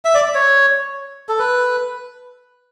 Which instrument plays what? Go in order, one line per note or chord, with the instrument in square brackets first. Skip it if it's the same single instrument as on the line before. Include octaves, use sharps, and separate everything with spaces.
[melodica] E5
D5
C#5
A4
B4